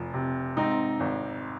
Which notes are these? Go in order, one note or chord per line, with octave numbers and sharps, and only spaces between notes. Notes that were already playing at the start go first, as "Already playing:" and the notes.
Already playing: F1 F3
C3
G#2 C4 D#4
G#1